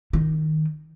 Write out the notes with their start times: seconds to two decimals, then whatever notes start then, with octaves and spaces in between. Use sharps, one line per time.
0.13 D#3